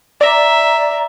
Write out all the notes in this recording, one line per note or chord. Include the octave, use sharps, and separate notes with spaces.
D5 E5 A#5